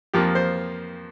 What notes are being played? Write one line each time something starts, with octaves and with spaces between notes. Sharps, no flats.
F2 F3 A#3 G4
C5